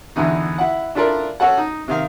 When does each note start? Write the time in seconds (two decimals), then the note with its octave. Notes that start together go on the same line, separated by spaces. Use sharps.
0.16 E2 B2 D3 E3 D#4
0.58 E4 F#5
0.95 D4 E4 F4 A4 A#4 D5
1.40 C#4 F#4 A4 F#5
1.58 D#4
1.88 C3 D#3 F5